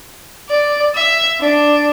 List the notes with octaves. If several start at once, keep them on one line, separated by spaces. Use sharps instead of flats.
D5
E5
D4